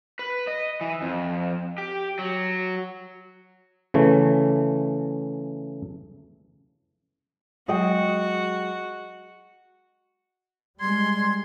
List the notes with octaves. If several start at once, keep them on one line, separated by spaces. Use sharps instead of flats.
B4
D#5
E3
F2
G4
F#3
C#3 E3 A3
F#3 G#3 F#4 G#4 D#5 G5
G3 G#3 C6 G#6